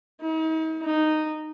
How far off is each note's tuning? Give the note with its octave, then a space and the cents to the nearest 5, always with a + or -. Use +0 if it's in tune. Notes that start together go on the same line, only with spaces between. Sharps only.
D#4 +40
D#4 -10